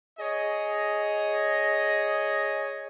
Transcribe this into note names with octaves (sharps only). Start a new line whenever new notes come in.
G#4 C#5 D#5